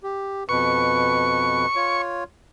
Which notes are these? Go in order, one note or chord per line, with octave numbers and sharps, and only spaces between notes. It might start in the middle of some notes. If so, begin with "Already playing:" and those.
G4
F2 B2 B4 C#6
F4 C#5